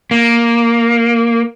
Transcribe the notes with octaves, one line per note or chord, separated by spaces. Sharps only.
A#3